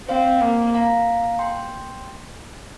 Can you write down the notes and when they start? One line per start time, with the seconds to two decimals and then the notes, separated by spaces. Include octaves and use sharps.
0.08 C4 C5 F5
0.41 A#3
0.74 F5 A#5
1.39 G5 C6